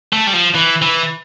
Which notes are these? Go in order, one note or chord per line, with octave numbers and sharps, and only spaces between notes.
A3
G3
F3
E3
E3